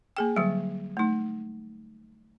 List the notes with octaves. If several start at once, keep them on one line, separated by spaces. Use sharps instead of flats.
A#3 G#4 G5
D3 F#3 G3
A3 D#4